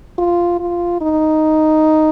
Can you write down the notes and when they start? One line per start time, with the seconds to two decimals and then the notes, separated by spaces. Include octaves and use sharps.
0.19 F4
0.60 F4
1.01 D#4